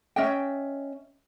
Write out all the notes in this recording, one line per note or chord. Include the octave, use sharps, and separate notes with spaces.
C#4 D#5 E5 G5